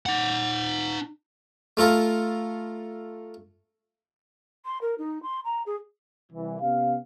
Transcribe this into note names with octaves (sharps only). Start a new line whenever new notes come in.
D#4 F#5
A3 F4 A4 A#4
C6
A#4
D#4
C6
A#5
G#4
C2 E3
C3 B3 C#4 G4 F5